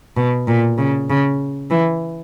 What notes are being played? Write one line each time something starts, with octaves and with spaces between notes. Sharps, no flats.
B2
A#2
C#3
C#3
E3